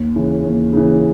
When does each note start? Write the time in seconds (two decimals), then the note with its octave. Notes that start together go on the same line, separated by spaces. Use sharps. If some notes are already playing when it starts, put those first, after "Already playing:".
Already playing: D#2
0.16 C#3 E3
0.44 D#2
0.73 C#3 E3